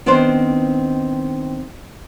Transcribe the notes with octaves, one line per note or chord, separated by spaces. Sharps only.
D#3 B3 C4 D4 D#4 C5